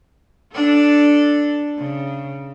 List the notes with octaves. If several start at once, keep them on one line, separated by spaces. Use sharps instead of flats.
D4 A4
C#3